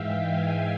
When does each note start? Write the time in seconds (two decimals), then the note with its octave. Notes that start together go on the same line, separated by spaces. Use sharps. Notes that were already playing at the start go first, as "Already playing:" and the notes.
Already playing: G#2 E3 G#3 E5 F5 G5
0.13 G#5